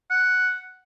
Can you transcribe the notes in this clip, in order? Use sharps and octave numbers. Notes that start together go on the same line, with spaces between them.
F#5